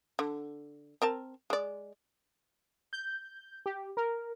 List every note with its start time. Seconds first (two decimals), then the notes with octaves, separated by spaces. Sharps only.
0.19 D3
1.02 C4 A#4 A5
1.50 G#3 D5
2.93 G6
3.66 G4
3.97 A#4